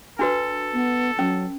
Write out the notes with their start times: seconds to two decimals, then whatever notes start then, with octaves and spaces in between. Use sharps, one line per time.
0.19 D4 F#4 A4 B4
0.73 B3
1.19 F#3 C#4